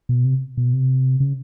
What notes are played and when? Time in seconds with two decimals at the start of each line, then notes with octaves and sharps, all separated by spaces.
0.09 B2
0.25 C3
0.57 B2
0.73 C3
1.20 C#3